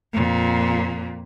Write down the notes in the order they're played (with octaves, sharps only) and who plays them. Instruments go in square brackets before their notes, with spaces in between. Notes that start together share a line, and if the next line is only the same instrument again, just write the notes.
[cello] F2 A#2